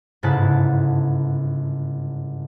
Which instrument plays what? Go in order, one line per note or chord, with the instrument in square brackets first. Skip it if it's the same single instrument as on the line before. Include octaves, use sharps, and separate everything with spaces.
[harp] G1 G#2 C#3 E4 A5 F#6